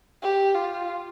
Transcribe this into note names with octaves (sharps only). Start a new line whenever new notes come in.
G4
F4